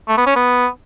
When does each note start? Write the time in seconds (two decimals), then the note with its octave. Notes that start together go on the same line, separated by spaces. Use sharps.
0.08 A3
0.17 B3
0.27 C#4
0.36 B3